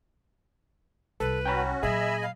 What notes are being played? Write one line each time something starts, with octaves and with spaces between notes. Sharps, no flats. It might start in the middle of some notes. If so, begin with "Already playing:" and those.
C2 A4 B4
C#4 F#4 G5 A#5 B5
A#2 F#3 G#4 D#5 E5 G#5 B5
F5